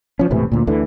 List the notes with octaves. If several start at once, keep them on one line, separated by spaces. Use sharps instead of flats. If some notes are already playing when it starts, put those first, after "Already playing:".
F3 C#4
E1 A2 C3 E3
D2 A#2
D2 D3 E3